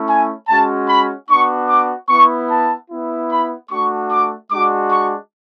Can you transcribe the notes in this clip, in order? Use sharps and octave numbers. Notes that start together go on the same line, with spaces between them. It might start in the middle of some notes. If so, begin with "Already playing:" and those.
Already playing: A3 C#4 E4
G#5
G#3 C#4 F#4 A5
B5
B3 D4 F#4 C#6
D6
B3 E4 C#6
A5
B3 E4
B5
A3 D4 F#4 C#6
D6
G#3 D4 F#4 D6
C#6